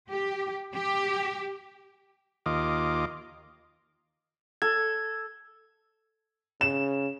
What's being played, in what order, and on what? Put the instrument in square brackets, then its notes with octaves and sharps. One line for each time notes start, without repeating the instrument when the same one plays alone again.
[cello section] G4
G4
[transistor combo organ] D#2 F4 D#5 D6
[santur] A4 [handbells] G#6
[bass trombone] C#3 [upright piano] E7